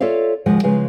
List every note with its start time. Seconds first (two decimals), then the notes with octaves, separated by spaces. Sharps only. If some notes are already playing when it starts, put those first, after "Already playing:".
0.01 F4 A4 C#5 D5 E5 F5
0.46 D#2 C#3 F3 G#3 F#5
0.63 C#3 F3 G#3 B4 F5